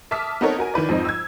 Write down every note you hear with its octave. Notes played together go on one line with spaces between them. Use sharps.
E5 A5 D6 D#6 F6 B6
B3 C4 D#4 A4 A#4 C#5
F#4 A#4 G#5
D#3 E4 B4 D5
F2 G#2 C4 D#4
E6 G#6